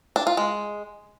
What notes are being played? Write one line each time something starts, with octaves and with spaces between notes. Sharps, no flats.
D4
F4
G#3